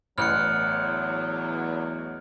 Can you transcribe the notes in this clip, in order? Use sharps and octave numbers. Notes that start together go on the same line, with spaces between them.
A1 E2 F#3 F6 F#6 C#7